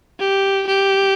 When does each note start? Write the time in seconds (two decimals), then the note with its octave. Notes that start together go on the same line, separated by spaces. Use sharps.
0.20 G4
0.67 G4